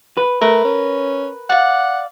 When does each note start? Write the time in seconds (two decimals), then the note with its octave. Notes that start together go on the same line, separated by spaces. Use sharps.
0.17 B4
0.42 A3 A#4 B4
0.65 C#4
1.50 D5 F5 F#5